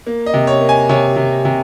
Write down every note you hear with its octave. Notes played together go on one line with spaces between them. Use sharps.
A#3
D#5
C3
C#5
A#3
G#5
C3 C#5
C3
C3